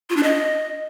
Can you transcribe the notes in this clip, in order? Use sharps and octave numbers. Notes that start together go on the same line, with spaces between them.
F4
D4
D#5